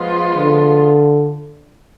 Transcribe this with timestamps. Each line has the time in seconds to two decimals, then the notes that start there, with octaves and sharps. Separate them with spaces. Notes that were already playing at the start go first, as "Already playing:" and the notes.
Already playing: F3 G#3 B3 F4
0.36 D3